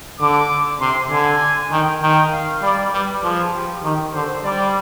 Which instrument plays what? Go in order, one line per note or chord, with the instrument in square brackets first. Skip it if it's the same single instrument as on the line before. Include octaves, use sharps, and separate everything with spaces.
[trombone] D3 [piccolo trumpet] D6
[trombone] C3 [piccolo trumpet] C6
[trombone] D3 [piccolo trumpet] G#5
[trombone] D#3 [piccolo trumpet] G5
[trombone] D#3 [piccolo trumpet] G5
[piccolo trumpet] F5
[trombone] G3 [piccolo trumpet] D5
[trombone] G3 [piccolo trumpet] B4
[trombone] F3 [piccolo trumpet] G#4
[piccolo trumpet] G4
[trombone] D#3 [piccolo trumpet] G4
[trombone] D3 [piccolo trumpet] C5
[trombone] G3 [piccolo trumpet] D5